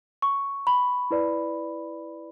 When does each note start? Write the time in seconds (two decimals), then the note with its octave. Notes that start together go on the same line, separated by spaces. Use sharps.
0.22 C#6
0.67 B5
1.11 E4 B4 D5